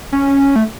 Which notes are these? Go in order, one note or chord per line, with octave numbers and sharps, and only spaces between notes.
C#4
A3